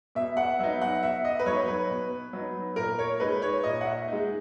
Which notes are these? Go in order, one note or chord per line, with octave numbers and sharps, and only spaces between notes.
B2 E5
F#5
F#3 B3 D#4 E5
F#5
B2 E5
D#5
B4
F#3 B3 D#4 C#5
B4
B2
F#3 B3 D#4
A#2 A#4
C#5
G#3 D#4 B4
C#5
A#2 D#5
F#5
E5
G#3 D#4